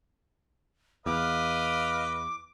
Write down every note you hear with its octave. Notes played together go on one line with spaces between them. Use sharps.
E2 B4 D#5 F5 D6